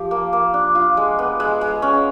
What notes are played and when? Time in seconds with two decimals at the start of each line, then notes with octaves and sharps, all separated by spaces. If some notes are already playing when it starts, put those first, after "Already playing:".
Already playing: F3 G4
0.11 A#3
0.33 A#3
0.54 D4
0.75 F4
0.97 G#3
1.19 B3
1.40 G#3
1.61 G#3
1.82 C#4